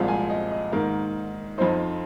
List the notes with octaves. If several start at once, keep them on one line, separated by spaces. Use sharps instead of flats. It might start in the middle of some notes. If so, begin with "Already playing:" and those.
Already playing: C2 A#2 F3 G#3 C4 F5
G#5
D#5
D#5
G#2 D#3 A#3 D#4 A#4
F2 F3 C4 D#4 C5